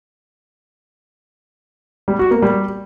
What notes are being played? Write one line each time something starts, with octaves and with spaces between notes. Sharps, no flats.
G3
F#4
A#3
G3